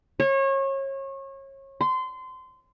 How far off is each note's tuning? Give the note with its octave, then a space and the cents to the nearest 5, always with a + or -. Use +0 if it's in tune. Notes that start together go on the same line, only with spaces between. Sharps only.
C#5 -30
C6 -25